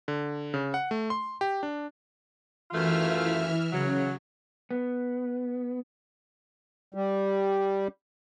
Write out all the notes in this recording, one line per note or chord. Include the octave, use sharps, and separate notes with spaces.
D3
C#3
F#5
A3
C6
G4
D4
F#2 E3 A3 F4 E5 F6
C#3 F#3
B3
G3